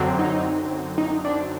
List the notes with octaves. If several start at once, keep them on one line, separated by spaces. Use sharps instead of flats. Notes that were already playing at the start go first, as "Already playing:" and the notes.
Already playing: F#2 D3 F#3 C4
D#4
D#4
D4